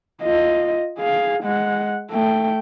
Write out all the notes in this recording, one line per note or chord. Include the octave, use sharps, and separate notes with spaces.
F4 D#5
G#4 F5
G#3 F#5
A3 G5